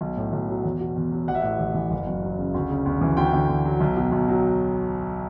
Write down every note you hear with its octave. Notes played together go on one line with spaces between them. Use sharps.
B1
A2
B1
F#3
E2
B2
E2
F#3
A1 F#5
E5
A2 F#5
A1
E3
F#1
F#2
F#3
C#3
D2
C#3
D2
E3
D2 G5
D3
D2
F#3
B1
B2
B1
F#3